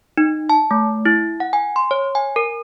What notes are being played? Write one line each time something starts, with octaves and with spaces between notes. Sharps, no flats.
D#4
A5
A3
E4
F#5
G#5
C6
C#5
G#5
A#4